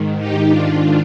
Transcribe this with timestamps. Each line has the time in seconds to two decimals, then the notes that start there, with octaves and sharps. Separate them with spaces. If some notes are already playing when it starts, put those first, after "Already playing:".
Already playing: G#2 D#3
0.19 D#4 G4
0.49 D4 F4